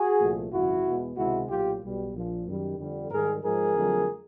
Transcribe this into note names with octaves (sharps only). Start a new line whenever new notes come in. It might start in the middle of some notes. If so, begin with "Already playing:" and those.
Already playing: F#4 G#4
C2 A#2 F3 A3
G#1 F#2 C#3 E4 F#4
E2 B2 G#3
C#2 C3 D#3 G#3 E4 F#4
B1 A#2 F#3 F4 G4
B1 B2 G3
A#1 A#2 F3
F#2 D#3 G3
F2 D3 G3
G#2 D#3 G3 G#4 A#4
G#2 F3 G#3 G#4 A#4
F2 D3 F#3 A3